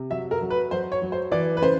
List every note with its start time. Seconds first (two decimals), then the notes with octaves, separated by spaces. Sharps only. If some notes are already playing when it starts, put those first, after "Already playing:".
Already playing: C3
0.10 F#3 E5
0.31 A#4
0.41 F#3
0.50 B4
0.71 F#3 C5
0.92 C#5
1.02 F#3
1.12 C5
1.32 E3 D5
1.57 B4
1.62 C#3 C5